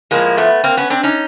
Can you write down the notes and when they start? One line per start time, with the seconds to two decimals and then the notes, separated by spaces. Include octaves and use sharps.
0.11 A2 F3 G#3 A#3
0.37 A3 B3
0.64 A#3 C4
0.77 B3 C#4
0.90 C4 D4
1.03 C#4 D#4